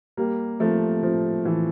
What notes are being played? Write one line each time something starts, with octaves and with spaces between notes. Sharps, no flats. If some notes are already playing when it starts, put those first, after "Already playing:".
G3 A#3
F3 A3
F3
E3